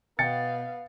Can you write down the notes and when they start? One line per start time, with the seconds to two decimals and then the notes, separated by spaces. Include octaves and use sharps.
0.19 B2 B3 F5 G5 A6 C#7